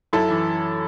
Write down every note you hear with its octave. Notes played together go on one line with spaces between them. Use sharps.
F#2 E4 A4
E3